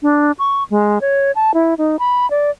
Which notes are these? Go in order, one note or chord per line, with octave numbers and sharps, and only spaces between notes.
D4
C#6
G#3
C#5
A5
E4
D#4
B5
D5